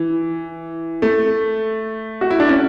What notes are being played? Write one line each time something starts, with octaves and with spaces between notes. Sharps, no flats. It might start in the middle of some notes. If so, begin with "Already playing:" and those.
Already playing: E3
A3
F#4
E4
D4
C#4